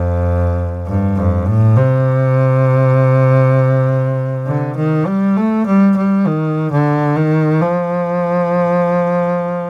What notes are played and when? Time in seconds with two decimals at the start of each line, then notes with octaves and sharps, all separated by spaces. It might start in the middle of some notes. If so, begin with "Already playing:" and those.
Already playing: F2
0.87 G2
1.17 F2
1.47 A2
1.77 C3
4.47 D3
4.76 D#3
5.06 G3
5.37 A3
5.66 G3
5.97 G3
6.26 D#3
6.71 D3
7.16 D#3
7.61 F3